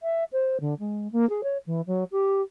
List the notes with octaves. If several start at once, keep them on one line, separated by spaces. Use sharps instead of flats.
E5
C5
D3
G#3
A#3
G#4
C#5
E3
F#3
G4